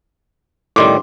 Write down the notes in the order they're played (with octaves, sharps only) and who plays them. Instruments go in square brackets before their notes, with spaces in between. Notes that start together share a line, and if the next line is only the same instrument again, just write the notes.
[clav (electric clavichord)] A2 D#3 G3 [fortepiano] C6 D6